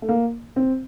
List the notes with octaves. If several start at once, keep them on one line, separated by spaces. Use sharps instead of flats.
A3
A#3
C4